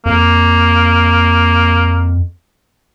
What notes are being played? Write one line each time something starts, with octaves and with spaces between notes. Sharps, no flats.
F2 A#3